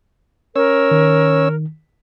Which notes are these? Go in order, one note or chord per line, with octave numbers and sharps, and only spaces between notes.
C#4 A#4 C#5 E6
D#3